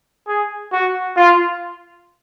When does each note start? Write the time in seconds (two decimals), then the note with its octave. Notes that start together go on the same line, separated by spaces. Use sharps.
0.28 G#4
0.72 F#4
1.17 F4